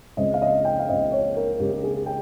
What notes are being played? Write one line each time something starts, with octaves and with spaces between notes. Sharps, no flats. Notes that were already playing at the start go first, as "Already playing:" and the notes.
C#2 C#3 G#3 C4 D#5
F5
D#5
G5
F5
C#2 C#3 G#3 C4 D#5
C#5
A#4
C#2 C#3 G#3 C4 G4
G#4
G5